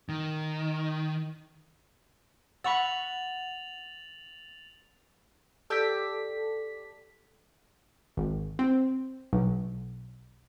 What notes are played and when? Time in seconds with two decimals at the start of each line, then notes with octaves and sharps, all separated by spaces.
0.09 D#3
2.64 F#5 B5 C#6 E6 A6 F7 F#7
5.70 G4 A4 D5 E6 B6
8.17 G#1
8.59 C4
9.33 B1